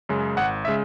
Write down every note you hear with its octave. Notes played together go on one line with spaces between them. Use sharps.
F#2 C#3 G#3
G#1 F#5
C#3 G#3 E5